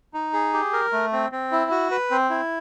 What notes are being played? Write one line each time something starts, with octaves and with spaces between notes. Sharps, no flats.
D#4
G#4
G4
A#4
A3
C4
C4
E4
F#4
B4
C4
E4